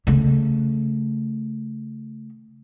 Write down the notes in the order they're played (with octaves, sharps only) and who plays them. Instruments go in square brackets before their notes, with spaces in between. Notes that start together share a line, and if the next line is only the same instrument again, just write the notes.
[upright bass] C#3 A3